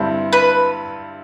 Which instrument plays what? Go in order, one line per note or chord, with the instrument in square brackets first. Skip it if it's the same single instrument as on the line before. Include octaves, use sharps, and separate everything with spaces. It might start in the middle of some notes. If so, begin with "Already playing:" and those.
Already playing: [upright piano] G2 D3 G3 C4 E4
[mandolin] B4